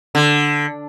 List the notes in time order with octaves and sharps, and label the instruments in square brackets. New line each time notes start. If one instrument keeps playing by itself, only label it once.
[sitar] D3